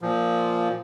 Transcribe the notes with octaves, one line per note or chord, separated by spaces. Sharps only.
A#2 F3